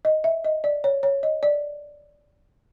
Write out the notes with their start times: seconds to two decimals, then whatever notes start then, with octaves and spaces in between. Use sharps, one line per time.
0.05 D#5
0.24 E5
0.44 D#5
0.64 D5
0.84 C#5
1.03 C#5
1.23 D#5
1.43 D5